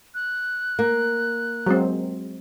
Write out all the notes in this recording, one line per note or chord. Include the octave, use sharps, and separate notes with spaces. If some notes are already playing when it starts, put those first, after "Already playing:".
F#6
A#3
F#3 G#3 C4